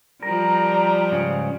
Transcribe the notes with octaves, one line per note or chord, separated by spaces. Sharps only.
F3 G3 A#4 A5 A#5
G#2 C#3